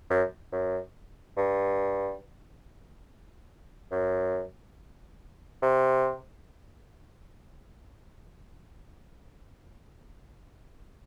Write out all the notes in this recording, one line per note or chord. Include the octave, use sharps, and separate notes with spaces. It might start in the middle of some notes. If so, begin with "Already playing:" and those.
F#2
F#2
G2
F#2
C3